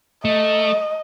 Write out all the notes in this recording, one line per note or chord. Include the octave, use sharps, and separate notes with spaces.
A3 D#5